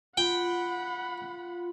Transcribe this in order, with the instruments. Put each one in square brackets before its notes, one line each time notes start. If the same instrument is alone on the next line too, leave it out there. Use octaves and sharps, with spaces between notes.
[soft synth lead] F4 [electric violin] F#5 B5 [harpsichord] G5